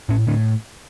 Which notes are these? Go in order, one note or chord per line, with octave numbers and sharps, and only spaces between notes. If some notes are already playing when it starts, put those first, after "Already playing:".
A2 C#4
A2 D3